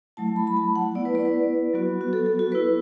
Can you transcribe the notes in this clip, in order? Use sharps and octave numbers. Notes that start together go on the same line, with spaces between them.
F#3 A3 E4 A5
B5
B5
A5
F#5
B3 E4 D5
B4
D5
B4
F#3 B3 F#4
F#4
A4
A4
F#4
B3 E4 B4